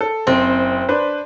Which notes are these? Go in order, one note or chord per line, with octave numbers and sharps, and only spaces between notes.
A4
F#1 C4
D4 B4 C5